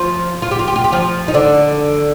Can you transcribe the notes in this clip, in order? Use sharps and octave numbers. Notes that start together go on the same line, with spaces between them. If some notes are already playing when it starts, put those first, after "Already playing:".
Already playing: F3 F4
F4
G4
F4
G4
F4
G4
F3 F4
D#4
D3 D4